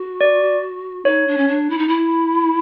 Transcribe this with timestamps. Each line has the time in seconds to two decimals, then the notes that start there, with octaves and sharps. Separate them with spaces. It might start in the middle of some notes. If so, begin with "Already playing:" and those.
Already playing: F#4
0.21 D5
1.05 D#4 C#5
1.28 D4
1.37 C#4
1.48 D4
1.70 E4
1.78 D#4
1.88 E4